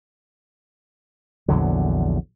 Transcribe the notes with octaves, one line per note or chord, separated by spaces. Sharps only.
A#1 E2 D3 F#3